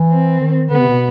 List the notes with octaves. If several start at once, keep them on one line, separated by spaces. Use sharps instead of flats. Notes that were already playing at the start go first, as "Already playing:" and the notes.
Already playing: E3
C4
D#3
D3 B3
C3
B2